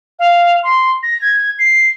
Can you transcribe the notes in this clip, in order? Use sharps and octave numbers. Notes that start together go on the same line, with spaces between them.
F5
C6
A#6
G#6
C7